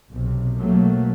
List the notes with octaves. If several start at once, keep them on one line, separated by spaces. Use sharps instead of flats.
B1 C3
B2 F#3 A3 A#3